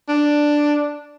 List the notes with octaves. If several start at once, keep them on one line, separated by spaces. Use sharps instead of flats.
D4